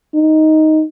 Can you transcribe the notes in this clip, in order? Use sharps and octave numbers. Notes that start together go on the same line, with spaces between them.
D#4